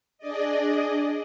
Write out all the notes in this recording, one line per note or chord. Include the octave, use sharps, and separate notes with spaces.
D4 G#4 D5 D#5